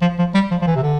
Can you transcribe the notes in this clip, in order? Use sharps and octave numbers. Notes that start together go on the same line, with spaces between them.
F3
F3
G3
F3
F3
E3
C3
D3